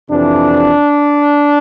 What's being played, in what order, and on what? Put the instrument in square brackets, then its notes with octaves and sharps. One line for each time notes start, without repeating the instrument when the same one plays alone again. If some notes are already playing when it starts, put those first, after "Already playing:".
[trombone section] F2 C3 E3 D4